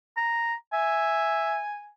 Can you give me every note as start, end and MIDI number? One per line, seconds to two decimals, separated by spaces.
0.17 0.54 82
0.73 1.60 76
0.73 1.89 80